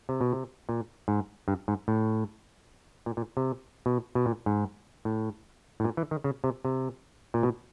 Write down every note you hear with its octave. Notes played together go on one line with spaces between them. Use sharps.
C3
B2
C3
A#2
G#2
G2
G#2
A2
A#2
A#2
C3
B2
B2
A#2
G#2
A2
A2
A#2
E3
D#3
C#3
C3
C3
A#2
B2